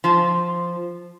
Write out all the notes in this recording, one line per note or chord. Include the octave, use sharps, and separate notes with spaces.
F3